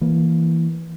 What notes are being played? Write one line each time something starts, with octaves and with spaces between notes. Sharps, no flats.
E3 A#3